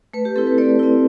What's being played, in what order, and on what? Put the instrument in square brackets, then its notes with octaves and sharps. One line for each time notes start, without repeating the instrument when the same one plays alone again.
[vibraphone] A3 B4
G4
C4 E4 A4
B4
A3 D5
C4 E4